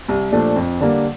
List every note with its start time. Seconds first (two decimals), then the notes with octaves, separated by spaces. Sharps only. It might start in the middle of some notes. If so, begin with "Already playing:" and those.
0.08 C2
0.32 A#2 F3 A3 D4
0.56 F2
0.81 D3 G3 A#3